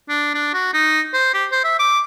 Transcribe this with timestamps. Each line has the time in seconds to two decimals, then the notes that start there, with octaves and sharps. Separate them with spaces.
0.09 D4
0.34 D4
0.54 F#4
0.74 D#4
1.14 C5
1.34 G4
1.52 C5
1.64 E5
1.79 D6